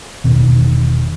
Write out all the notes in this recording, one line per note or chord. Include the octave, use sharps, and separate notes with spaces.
E1 B2 D#3